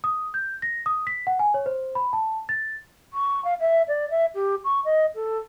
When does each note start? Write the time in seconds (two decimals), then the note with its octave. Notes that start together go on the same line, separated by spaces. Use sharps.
0.04 D#6
0.34 G6
0.62 A#6
0.86 D#6
1.07 B6
1.27 F#5
1.39 G#5
1.54 C#5
1.66 C5
1.95 B5
2.13 A5
2.49 A6
3.13 C#6
3.44 F5
3.60 E5
3.88 D5
4.10 E5
4.35 G4
4.64 C#6
4.85 D#5
5.15 A4